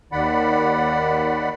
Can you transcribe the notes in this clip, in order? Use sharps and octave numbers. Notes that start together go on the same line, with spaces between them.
D#2 D#3 D5 F#5 B5